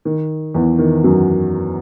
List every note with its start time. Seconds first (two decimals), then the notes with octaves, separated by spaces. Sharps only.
0.05 D#3
0.55 E2 E3
0.79 D#3
1.04 F#2 F#3